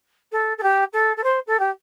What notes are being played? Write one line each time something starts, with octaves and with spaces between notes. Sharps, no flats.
A4
A4
G4
A4
A4
C5
A4
G4